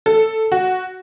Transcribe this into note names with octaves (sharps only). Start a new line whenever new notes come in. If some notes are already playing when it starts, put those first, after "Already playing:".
A4
F#4